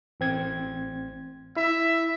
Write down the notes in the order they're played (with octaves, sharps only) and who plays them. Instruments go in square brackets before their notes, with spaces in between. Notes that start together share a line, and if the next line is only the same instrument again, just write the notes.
[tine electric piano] A1 C4 G#6
[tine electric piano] E4 [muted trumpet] E5